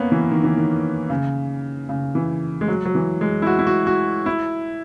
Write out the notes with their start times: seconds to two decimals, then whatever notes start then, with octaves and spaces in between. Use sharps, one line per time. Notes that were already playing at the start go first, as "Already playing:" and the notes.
Already playing: A#3 B3 C#4
0.12 E3
0.31 D#3
0.44 E3
0.57 D#3
1.10 C#3
1.89 C#3
2.15 E3
2.61 G#3
2.68 F#3
2.85 F#3
2.95 E3
3.21 G#3
3.42 E4
3.47 F#4
3.59 E4
3.67 F#4
3.87 F#4
4.26 E4